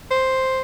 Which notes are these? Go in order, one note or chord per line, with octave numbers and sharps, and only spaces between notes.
C5